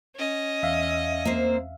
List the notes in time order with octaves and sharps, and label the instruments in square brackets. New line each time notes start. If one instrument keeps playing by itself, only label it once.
[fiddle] C#4 D#5
[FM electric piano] E2 E5 F5
[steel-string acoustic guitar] A#3 C4 C5